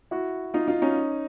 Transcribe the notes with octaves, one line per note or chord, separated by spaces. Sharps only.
E4 F#4
D#4 F4
D#4 F4
C#4 D#4